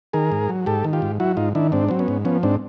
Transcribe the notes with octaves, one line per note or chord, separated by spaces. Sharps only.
D#3 G#4 A#4
G#2
F#3
G#2 G4 A4
D#3
F4 G4
G#2
F#3 E4 F#4
G#2 D#4 F4
D#3 D4 E4
G#2 C4 D4
F#3 C4
B3 C#4
G#2
F3 B3 C#4
G#2 C4 D4